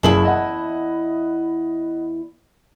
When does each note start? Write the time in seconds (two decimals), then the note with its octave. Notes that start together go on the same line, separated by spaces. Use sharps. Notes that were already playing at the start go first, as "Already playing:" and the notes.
0.03 F#1 E2 E4 G#4 A5 F#7
0.25 D#5 F#5